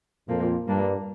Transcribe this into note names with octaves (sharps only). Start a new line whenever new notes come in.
F2 A#2 F3 A#3
G2 G3 A#3 D4